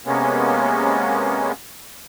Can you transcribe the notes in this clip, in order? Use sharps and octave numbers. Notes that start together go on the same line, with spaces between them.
C3 G#3 A#3 B3 C#4